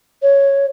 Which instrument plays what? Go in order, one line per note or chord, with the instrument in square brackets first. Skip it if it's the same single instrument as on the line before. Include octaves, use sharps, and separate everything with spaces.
[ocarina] C#5